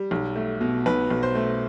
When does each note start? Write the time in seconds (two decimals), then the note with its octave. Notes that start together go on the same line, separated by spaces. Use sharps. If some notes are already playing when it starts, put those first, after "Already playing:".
Already playing: G3
0.11 B1
0.36 A3
0.61 B2
0.86 B1 B4
1.10 B1
1.23 C5
1.35 A3